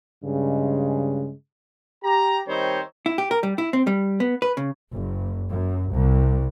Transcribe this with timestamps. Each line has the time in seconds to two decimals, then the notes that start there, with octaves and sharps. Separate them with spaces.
0.24 G2 C#3 G#3
2.04 G4 A#5
2.48 D#3 G3 C4 D#4 C5 C#5
3.06 E4
3.18 G4
3.31 A#4
3.43 G3
3.58 E4
3.73 C4
3.87 G3
4.20 B3
4.42 B4
4.57 C#3
4.91 F#1
5.50 F#2
5.92 C2